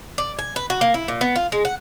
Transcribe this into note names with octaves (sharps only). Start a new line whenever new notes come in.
D5
G#5
B4
F#4
A#3
E4
A#2
B3
F4
G#3
F#5